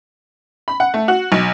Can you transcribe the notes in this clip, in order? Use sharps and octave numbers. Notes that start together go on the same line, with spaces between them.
B5
F#5
A3
F#4
B1